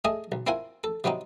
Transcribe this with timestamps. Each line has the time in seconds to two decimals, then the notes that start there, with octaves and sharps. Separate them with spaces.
0.05 A3 G#4 D#5 G#5
0.32 B1
0.47 C4 E4 F4 A#4 F#5 G#5
0.84 A4
1.04 C3 F#3 B3 C4 D#4